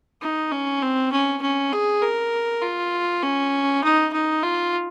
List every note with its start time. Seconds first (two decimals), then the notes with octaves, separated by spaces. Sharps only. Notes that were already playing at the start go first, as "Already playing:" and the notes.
0.21 D#4
0.52 C#4
0.82 C4
1.12 C#4
1.42 C#4
1.72 G#4
2.02 A#4
2.62 F4
3.23 C#4
3.84 D#4
4.13 D#4
4.43 F4